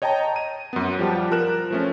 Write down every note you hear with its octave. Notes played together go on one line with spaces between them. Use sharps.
C#5 D#5 G5 A5 A#5
D#7
F#2 B3
F3 G3 G4 F#5 A5
F3 A#4 F#6 E7
F3 A3 C#4